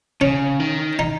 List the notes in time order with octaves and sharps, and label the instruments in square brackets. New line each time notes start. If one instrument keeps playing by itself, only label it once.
[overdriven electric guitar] C#3 [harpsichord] C#4
[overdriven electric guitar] D#3
[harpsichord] D#4